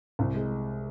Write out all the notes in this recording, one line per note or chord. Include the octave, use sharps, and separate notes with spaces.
C2
G#3